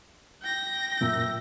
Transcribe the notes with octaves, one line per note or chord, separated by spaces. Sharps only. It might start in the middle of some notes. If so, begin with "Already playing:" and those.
G5 A#6
F#2 A#2 A#4 E5